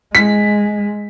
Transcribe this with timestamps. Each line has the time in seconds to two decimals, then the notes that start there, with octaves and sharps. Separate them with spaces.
0.15 G#3 B6